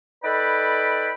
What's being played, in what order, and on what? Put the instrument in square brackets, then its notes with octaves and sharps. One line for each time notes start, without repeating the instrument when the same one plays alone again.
[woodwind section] D#4 A4 B4 D5 G5 B5